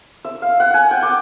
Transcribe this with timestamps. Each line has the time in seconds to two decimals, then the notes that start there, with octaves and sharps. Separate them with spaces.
0.25 E5
0.42 F5
0.60 F#5
0.74 G#5
0.91 G5
1.03 D6